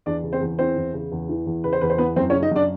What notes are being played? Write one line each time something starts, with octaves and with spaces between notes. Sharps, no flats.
E2 D4 D5
C#3
C4 C5
E2
E3 C4 C5
E2
C#3
E2
E3
E2
C#3 B4
C5
E2 B4
C5
E3 B3 B4
F#2 C4 C5
C#4 C#5
C#3
D#4 D#5
F#2 D4 D5